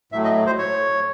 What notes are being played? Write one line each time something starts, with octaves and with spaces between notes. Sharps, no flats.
A2 F#3 A3 E5
D#5
C5
C#5